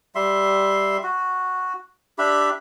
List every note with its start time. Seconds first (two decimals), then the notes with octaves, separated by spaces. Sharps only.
0.15 G3 E5 C6
1.03 F#4
2.18 D4 G4 E5 B5